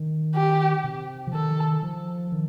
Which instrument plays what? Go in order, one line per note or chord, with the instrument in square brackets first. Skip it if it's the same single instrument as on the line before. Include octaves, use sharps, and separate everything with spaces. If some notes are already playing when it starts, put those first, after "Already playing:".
Already playing: [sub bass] D#3
[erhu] G4
[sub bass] C3
F3
[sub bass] D#3 [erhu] A4
[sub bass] F3
D#3